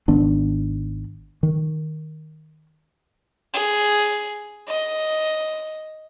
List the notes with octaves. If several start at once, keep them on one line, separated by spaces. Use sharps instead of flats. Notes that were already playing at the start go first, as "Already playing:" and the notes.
G#1 D#3 B3 D4
D#3
G#4
D#5